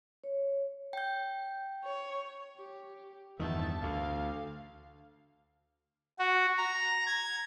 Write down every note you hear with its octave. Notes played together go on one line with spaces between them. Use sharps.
C#5
G5 G6
C#5
G4
E2 G2 D#3 E5 A5
D2 D3 F5
F#4
A#5
G#6